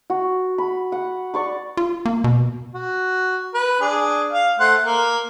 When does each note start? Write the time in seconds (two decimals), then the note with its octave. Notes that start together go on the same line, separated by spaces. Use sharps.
0.10 F#4
0.58 B5
0.92 F#5
1.34 D5 C#6 D6
1.77 F4
2.05 A#3
2.24 B2
2.74 F#4
3.54 B4
3.81 D4 G#4
4.32 F5
4.59 A3 C5 F#5
4.84 A#3